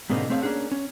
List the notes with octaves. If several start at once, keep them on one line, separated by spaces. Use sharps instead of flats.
G#2 B2 D3 A#3 C4 D#4
A3 C4 G#4 C#5 E5 F5
A#3 C#4 D4 G#4 F#5
C#4